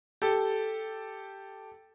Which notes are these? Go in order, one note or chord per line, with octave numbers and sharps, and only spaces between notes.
G4 A4